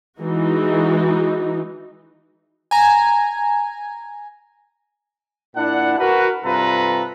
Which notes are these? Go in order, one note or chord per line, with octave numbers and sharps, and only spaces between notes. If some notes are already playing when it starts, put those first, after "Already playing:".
E3 G#3 D#4 F#4
G#5 A#5
A#2 D4 E4 F#5
F#4 A#4 B4
G2 C3 F4 A4 B4 A#5